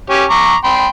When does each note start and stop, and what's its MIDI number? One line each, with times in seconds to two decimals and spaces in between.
0.10 0.24 61
0.10 0.24 67
0.10 0.24 73
0.30 0.56 82
0.30 0.56 85
0.30 0.56 86
0.64 0.87 79
0.64 0.87 83
0.64 0.87 84